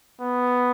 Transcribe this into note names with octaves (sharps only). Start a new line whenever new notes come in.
B3